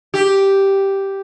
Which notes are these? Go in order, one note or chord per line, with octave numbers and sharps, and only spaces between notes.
G4